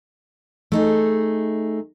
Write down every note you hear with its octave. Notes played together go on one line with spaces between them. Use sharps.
A3 D#4 G#4